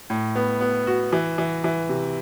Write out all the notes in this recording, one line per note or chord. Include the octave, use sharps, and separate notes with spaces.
A2
B3
B3
F#4
E3
E3
E3
C3